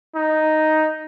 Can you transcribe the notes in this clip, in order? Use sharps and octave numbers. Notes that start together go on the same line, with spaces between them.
D#4